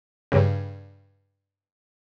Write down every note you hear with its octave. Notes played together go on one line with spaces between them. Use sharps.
G2 C#3